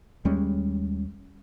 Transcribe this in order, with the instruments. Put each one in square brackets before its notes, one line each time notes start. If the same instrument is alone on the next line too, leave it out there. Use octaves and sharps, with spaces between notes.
[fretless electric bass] D#2 G3 G#3 C#4